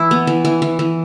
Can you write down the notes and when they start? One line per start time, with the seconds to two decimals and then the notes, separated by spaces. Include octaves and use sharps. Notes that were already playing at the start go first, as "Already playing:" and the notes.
Already playing: E3 E4
0.11 B3
0.27 E3
0.45 E3
0.62 E3
0.79 E3